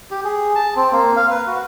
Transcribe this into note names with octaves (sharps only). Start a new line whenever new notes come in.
G4
G#4
A5
C4
A#3
F5
B4
F#4